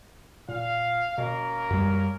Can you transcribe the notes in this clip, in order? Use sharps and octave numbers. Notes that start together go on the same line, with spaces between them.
A#2 F5
B2 A#3 C#4 A#4
F#2 G3